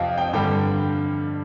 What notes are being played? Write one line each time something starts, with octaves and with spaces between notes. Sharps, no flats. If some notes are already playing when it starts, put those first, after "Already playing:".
Already playing: F2 C3 F3 D#5 F5
G5
G2 D3 G3 G5